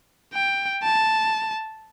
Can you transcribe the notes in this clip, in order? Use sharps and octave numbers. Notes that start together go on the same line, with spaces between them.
G5
A5